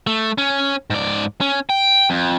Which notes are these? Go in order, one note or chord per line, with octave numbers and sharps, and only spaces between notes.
A3
C#4
G#2 D5
C#4
G5
F2